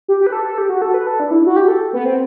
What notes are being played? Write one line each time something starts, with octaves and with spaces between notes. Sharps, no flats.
G4
G4
B4
A4
A4
G4
F#4
A4
B4
A4
D4
E4
F#4
G4
A4
B3
C4